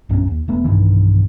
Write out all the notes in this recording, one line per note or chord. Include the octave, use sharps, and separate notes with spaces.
A#1 F#2 A2 C#4
D#2
E1 A3 B3
B1 G2 D#3 E3